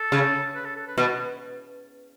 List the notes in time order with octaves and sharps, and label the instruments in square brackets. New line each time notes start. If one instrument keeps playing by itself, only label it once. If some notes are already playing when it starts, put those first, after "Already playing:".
Already playing: [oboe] A4
[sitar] C#3
[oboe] B4
A4
A4
B4
[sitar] B2 [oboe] B4
[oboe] F#4